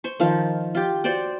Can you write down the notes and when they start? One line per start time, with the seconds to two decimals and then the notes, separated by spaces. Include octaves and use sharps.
0.04 C5 C#6
0.20 D#3 F3 F5
0.75 F4 G4
1.04 F#4 C5 D5 G5